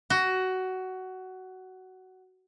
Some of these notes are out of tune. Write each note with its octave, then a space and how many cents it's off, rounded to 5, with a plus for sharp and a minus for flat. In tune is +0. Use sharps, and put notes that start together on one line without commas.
F#4 +15